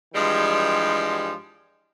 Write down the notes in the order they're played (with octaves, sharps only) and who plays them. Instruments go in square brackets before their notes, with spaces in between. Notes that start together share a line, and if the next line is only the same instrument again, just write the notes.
[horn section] G2 E3 F3 G3 G#3